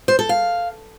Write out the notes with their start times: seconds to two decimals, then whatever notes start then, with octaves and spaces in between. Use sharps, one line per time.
0.08 C5
0.19 A4
0.29 F5